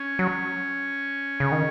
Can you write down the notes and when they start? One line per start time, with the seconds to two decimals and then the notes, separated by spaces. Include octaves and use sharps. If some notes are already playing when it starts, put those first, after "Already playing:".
Already playing: C#4
0.19 F#3
1.40 C#3
1.52 D#3